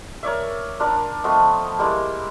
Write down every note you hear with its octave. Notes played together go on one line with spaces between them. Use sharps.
A#4 C#5 D5 E5
D4 F4 A#4 D5
F3 A3 B3 D#5
G3 G#3 A#3 E4